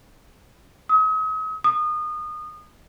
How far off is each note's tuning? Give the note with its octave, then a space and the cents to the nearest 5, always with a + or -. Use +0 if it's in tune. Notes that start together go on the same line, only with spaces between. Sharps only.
D#6 +40
D#6 -25